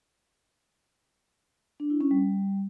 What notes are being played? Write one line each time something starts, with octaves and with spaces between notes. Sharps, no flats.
D4
E4
C#4
G3